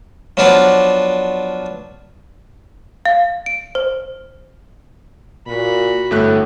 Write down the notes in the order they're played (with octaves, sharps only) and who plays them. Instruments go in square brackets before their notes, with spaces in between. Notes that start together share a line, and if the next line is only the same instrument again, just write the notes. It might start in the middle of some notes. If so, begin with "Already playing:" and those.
[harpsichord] F3 F#3 B3 D4 F4 D5
[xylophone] F5
D7
C5
[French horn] A#2 [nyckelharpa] F#4 B5
[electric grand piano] G1 A3 F#6 [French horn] A2